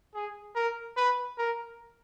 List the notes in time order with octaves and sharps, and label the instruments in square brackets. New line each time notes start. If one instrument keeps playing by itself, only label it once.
[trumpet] G#4
A#4
B4
A#4